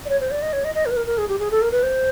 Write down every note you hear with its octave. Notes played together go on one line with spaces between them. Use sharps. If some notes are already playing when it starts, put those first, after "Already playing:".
D5
C#5
C5
D5
D#5
C#5
D#5
D#5
A#4
B4
A#4
A#4
G#4
G4
G#4
A4
A#4
B4
C5